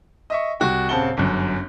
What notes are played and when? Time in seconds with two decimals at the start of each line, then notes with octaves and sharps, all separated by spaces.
0.30 D#5 E5 C#6
0.60 C2 F#4 G5
0.89 D#1 C#3 C4 F#5 A5 G7
1.17 G1 F#2